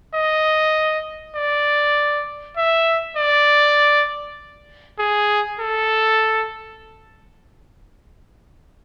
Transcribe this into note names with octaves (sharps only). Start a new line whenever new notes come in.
D#5
D5
E5
D5
G#4
A4